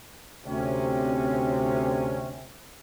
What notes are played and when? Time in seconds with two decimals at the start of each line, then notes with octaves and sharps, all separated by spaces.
0.46 D2 C3 C#4